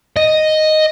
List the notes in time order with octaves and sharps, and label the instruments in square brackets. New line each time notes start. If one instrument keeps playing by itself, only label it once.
[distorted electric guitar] D#5